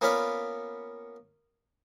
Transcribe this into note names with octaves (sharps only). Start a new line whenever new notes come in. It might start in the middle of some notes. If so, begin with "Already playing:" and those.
A#3 B3 C#4 F4 B4 D5